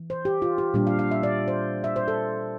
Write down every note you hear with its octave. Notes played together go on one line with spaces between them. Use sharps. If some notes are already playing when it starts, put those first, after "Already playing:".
Already playing: E3
C5
G4
F4
G4
A#2 G3 D4 G4
F5
F5
E5
D5
C5
E5
C5
A4